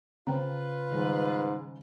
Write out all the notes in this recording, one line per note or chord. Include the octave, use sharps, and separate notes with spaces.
C#3 F4 B4 C5 G5 A#5
G#2 D#3 G3